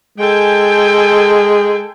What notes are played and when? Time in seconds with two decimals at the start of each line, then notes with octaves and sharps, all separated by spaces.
0.18 G#3 A4 G5 G#5